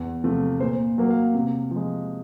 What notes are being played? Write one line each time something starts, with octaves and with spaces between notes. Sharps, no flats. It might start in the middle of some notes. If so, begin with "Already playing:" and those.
Already playing: E2
C3 F3 A3
A#2 C5
F#3 A#3
F5
C3
F3
G#3